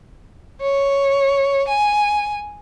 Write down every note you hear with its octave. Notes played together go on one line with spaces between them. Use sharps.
C#5
G#5